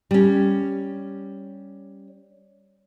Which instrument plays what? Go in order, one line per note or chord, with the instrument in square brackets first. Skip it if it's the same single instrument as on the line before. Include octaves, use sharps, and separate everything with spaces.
[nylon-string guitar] G3 C#4